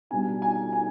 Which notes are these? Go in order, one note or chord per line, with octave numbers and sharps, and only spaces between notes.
B2 G3 B3 D4 G#5
G#5
G#5